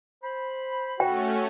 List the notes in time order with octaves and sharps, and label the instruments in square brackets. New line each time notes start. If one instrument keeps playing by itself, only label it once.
[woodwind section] C5 B5
[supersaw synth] A3 C#4 [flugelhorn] F#4 [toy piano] G5